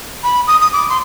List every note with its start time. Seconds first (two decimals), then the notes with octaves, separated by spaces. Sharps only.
0.23 B5
0.47 D#6
0.61 D#6
0.73 D6
0.89 C6